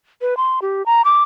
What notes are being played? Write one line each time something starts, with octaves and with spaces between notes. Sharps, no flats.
B4
C6
G4
A#5
D6